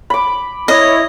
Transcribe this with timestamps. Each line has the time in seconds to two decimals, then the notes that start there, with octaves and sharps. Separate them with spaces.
0.10 B5 D6
0.68 E4 C#5 D#5